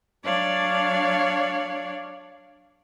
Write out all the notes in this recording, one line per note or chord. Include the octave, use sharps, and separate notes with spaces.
F#3 D4 C#5 D5 F5